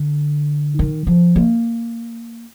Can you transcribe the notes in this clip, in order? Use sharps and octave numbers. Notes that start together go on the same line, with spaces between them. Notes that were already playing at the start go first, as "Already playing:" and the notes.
Already playing: D3
D#3
F3
A#3